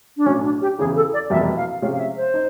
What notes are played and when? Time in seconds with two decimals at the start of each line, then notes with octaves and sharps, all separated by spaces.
0.17 D4
0.26 B1 A2 F#3 C#4
0.44 D4
0.61 G4
0.78 E1 E2 C#3 E3 G#4
0.96 A4
1.13 D5
1.30 F1 E2 B2 G3 A#3 E5
1.57 F5
1.82 C3 F3 G#3 C#4 F4 F5
1.93 F5
1.99 E5
2.17 C5
2.34 D#4